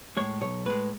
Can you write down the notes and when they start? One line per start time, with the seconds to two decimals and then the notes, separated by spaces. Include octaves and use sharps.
0.17 A2 G#3 C#5
0.41 B1 C#5
0.66 A2 G#3 B4